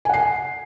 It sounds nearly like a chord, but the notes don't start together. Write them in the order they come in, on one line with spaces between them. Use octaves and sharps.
G#5 F#5 C7